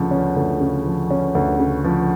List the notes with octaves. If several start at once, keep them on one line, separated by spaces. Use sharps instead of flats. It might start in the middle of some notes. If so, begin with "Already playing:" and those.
Already playing: D2 C#3 F3
C#4
D2
C#3
F3
C#4
D2
C#3
F3